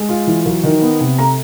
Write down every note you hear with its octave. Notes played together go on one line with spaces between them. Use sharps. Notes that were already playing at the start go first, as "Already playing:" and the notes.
Already playing: G#3
F4
E3
F#3
D#3
B3
C3
A3 A#5